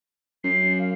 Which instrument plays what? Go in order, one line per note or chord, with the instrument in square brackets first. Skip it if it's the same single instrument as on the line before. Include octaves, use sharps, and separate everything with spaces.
[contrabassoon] F#2 [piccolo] C7
[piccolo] F5